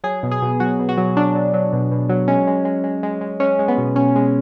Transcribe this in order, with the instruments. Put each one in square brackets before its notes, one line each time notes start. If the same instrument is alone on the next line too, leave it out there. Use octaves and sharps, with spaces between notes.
[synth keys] F#3 G#4
B2
G#4
B2
F#3 F#4
B2
F#4
F#3
F#3 D4
F#3
F#3
B2
B2
F#3
G#3 C#4
G#3
G#3
G#3
G#3
G#3
G#3 C#4
G#3
B3
B2
B2 C#4
G#3